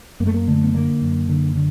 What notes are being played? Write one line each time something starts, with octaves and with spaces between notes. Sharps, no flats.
F#2 A#3
A3
A#3
D3 A3
B3
D3 A#3
F#2
D3
D3